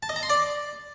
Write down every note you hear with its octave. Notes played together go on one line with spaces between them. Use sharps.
A5
D#5
A#5
C6
D5